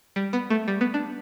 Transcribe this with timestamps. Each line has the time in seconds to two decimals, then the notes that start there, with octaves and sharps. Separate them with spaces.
0.16 G3
0.33 B3
0.50 A3
0.68 G3
0.81 B3
0.94 D4